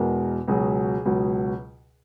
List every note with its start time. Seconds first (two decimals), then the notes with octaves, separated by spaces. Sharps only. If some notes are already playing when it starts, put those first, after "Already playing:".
Already playing: E2 B2 G#3 A#4
0.48 C#2 B2 F#3 G#4
1.05 C#2 B2 F#3